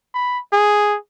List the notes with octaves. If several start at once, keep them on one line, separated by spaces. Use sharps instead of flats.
B5
G#4